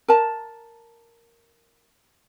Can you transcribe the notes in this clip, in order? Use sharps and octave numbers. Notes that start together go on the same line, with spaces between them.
A#4 A5